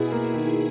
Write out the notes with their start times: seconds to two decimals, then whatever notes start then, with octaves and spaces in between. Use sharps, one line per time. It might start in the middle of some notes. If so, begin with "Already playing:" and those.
Already playing: B2 E4 G#4
0.12 A#3
0.34 D#3